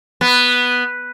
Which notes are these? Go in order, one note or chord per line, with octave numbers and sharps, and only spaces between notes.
B3